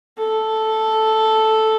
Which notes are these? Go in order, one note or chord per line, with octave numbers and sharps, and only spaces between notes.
A4